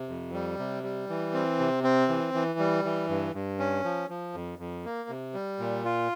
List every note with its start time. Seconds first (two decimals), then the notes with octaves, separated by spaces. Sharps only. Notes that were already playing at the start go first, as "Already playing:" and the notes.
Already playing: C3
0.09 F2
0.33 G3
0.59 C3
0.83 G3
1.09 E3
1.33 C4
1.59 C3
1.84 C4
2.09 E3
2.34 E3
2.59 G3
2.84 E3
3.09 G2
3.34 G2
3.59 C#4
3.84 F3
4.09 F3
4.34 F2
4.59 F2
4.85 A#3
5.09 C3
5.34 G3
5.59 A#2
5.85 F4